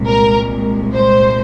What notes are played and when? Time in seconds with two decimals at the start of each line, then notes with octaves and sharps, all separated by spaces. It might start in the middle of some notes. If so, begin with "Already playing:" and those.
Already playing: C2 A#2 G#3
0.09 A#4
0.95 C5